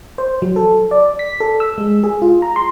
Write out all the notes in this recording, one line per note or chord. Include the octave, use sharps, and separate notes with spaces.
C5
F#3
A4
D5
B6
A4
E6
G#3
G#4
F4
A#5
C6